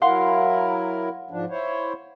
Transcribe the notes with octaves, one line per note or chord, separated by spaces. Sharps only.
F#3 E4 A#4 F5 F#5 C6
G#2 F3 D4
E4 C5 C#5